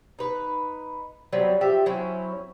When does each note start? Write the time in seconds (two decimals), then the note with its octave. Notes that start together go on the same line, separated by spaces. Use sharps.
0.19 D#4 B4
1.33 F#3 G3 B3 C4
1.61 F3 G4 E5
1.86 F#3 C4 C#4 E4